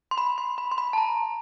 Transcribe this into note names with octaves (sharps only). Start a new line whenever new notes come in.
C6
B5
C6
B5
C6
B5
A5
A#5